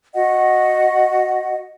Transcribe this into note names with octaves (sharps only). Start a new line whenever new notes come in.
F#4 D#5 F#5